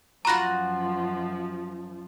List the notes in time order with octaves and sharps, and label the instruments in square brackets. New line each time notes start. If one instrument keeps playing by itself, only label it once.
[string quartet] F#2 F3 [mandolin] F4 F#4 C#6 [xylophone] A#5 B5 A#6